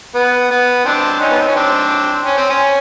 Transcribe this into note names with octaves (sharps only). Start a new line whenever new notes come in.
B3
B3
C4 D4
C#4 D#4
B3
C4
C#4
C4 D4
C#4
C4
C#4